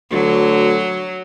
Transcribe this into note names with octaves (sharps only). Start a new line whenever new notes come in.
D2 F#3